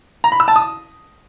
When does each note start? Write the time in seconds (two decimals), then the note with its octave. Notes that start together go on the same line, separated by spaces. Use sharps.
0.24 A#5
0.32 B5
0.40 E6
0.48 A5
0.56 D#6